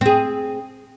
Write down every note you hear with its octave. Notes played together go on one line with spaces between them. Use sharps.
C4 G#4